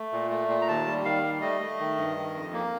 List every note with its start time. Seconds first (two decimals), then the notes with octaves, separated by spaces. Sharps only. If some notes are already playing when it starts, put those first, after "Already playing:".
Already playing: A3
0.12 A#2
0.30 A3
0.48 A#2
0.62 A#5
0.67 D#2 A5
0.86 G3
1.04 D#3 F5
1.23 G3
1.42 A3 D#5
1.61 A3
1.79 D#3
1.97 G2
2.16 D#3
2.34 F2
2.53 A#3